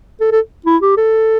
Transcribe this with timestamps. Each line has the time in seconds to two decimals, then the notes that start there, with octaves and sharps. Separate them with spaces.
0.21 A4
0.32 A4
0.66 E4
0.82 G4
0.97 A4